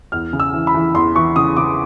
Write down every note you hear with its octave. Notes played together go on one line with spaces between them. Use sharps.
E2 F6
C#3
E6
E3
B5
E3
E2 C6
E3 C#6
C#3 D#6
C#3 D6